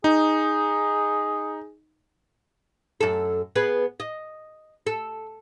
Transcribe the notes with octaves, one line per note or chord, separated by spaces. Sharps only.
D#4 G#4
F#2 A4
B3 G#4 B4
D#5
A4